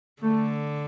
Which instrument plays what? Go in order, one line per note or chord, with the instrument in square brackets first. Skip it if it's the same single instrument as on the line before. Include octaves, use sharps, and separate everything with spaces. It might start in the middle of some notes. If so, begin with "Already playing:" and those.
[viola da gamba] D3 [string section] A3